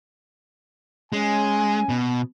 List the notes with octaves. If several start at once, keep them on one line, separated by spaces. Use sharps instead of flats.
G#3 C#4 G#5
B2